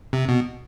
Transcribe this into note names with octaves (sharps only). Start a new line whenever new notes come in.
C3
B2